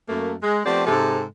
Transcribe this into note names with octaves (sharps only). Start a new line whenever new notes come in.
F#2 A3 A#3
G#3
F3 A3 B3 C4 G4 D5
G#2 C3 A4